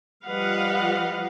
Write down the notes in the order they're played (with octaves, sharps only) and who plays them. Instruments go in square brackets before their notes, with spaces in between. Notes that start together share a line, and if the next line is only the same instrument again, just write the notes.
[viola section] F3 G3 B4 D#5 F5 F#5